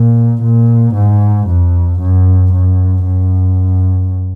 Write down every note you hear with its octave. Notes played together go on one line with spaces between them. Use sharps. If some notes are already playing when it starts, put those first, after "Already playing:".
Already playing: A#2
A#2
G#2
F2
F#2
F#2
F#2